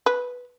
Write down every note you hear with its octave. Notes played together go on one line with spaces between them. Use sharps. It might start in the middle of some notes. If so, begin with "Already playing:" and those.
B4